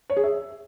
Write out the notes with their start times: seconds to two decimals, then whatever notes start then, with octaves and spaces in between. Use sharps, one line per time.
0.10 C#5
0.17 G#4
0.24 E5